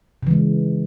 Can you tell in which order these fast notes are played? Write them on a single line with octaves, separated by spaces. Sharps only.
C#3 E3 G#3